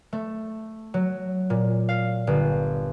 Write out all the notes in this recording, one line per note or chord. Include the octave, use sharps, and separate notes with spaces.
A3
F#3
A#2
F5
G1